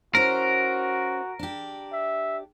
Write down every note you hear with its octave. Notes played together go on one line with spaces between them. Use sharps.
C#4 E4 F#4 A#4 C5
D4 G4
E5